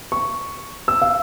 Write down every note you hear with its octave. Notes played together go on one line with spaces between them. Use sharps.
C#6
E6
F5